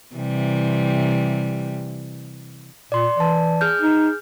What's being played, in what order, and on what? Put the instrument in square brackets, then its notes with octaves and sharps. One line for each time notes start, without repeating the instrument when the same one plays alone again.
[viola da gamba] C3 E3 G3
[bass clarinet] A#2 [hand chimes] D5 C6
[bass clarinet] E3 [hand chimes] D5 A5
[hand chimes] G#4 F6 G6
[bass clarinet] D#4